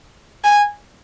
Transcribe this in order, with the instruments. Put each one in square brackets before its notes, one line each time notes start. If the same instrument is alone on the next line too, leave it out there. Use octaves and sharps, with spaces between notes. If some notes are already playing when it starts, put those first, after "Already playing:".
[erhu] G#5